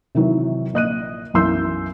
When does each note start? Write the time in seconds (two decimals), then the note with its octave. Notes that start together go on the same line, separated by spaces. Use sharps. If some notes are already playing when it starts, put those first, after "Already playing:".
0.15 C3 D#3 E3 F#3
0.74 A#1 D#5 F#6 D#7
1.34 B1 F#2 E3 C6 E6 G6